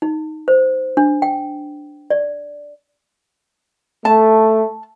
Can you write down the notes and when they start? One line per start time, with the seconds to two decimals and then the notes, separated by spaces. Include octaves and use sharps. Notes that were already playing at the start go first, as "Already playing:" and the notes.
0.02 D#4
0.48 C5
0.97 D4
1.22 G5
2.10 D5
4.05 A3 A5